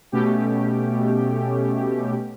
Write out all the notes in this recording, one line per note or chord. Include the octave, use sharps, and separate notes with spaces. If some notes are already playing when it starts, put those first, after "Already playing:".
B2 A3 C#4 G4